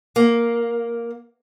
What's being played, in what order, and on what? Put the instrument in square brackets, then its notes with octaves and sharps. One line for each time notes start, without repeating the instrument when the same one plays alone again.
[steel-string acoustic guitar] A#3